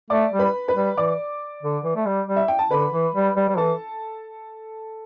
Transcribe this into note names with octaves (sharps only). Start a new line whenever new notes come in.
A3 D5 D6
G3
B4 B5
B4 B5
G3
E3 D5 D6
D3
E3
A3
G3
G3
E5
G5
A5
D3 B4 B5
E3
G3
G3
G3
E3 A4 A5